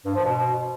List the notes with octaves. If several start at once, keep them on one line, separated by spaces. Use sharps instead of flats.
G2
F3
B2